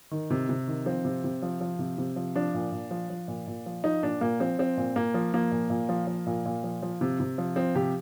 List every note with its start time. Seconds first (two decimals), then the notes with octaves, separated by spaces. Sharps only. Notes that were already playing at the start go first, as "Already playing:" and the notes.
0.11 D#3
0.30 C3
0.49 C3
0.67 D#3
0.86 F3 C4
1.05 C3
1.24 C3
1.42 F3
1.61 F3
1.79 C3
1.98 C3
2.16 F3
2.36 F3 D4
2.54 A#2
2.72 A#2
2.91 F3
3.10 F3
3.28 A#2
3.47 A#2
3.66 F3
3.84 F3 D#4
4.03 A#2 D4
4.21 A#2 A#3
4.40 F3 C4
4.59 F3 C4
4.77 A#2
4.96 A#2 A#3
5.14 F3
5.34 F3 A#3
5.51 A#2
5.70 A#2
5.89 F3
6.07 F3
6.26 A#2
6.45 A#2
6.64 F3
6.83 F3
7.01 C3
7.20 C3
7.38 F3
7.56 F3 C4
7.75 C3 G4